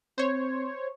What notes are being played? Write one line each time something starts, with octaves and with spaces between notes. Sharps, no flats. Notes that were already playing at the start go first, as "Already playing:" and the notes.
C4 C5 C#5